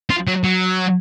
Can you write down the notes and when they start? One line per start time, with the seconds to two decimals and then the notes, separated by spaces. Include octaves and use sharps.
0.10 F4
0.27 F#3
0.44 F#3